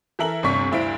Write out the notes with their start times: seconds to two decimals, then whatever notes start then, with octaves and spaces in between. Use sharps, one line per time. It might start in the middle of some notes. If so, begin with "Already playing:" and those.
0.19 E3 E4 A4 A#4 E5 F#7
0.43 G1 D2 C3 D4 C#6 B6
0.71 D2 G2 E4 C5 F5 D7